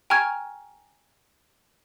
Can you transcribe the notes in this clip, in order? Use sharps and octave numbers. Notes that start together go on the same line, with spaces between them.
G5 G#5 A#5 C#6 F6 G#6